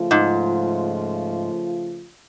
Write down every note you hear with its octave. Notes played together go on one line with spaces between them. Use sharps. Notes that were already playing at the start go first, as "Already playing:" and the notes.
Already playing: C#3 F3 A3 F4
G#2